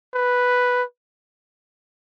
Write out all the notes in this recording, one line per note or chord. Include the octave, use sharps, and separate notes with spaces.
B4